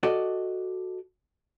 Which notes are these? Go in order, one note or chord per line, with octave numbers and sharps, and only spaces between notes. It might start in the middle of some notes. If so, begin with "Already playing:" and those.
F#4 A4 D5 D#5